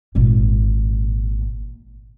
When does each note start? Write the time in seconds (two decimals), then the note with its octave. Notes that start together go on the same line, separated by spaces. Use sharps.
0.15 G#1 A#2